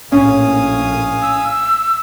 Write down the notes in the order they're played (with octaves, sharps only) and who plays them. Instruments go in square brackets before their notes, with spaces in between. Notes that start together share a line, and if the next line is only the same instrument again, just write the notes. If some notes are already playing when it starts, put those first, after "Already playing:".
[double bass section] A#1 A2 [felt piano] C#4 [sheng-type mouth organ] F5 G#5 D#6
[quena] E6